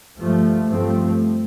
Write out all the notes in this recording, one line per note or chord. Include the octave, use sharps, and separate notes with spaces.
G2 F3 A3
G2 F3 A3 C4